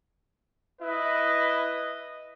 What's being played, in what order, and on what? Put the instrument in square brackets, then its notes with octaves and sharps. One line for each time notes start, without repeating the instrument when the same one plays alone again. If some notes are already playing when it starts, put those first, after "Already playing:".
[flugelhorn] E4 [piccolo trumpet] B4 [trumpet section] D#5